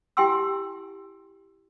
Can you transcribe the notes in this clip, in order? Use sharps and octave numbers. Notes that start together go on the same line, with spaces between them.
E4 G4 G5 G#5 C6 E6